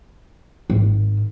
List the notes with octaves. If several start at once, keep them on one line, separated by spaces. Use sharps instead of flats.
G#1